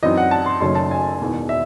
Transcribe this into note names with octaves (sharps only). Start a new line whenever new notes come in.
F#2 E3 C4 D#4 D#5
F#5
A5
C6
F#1 F#2 D#3 A3 C#4 C6
A5
G#5
E1 E2 D#3
E5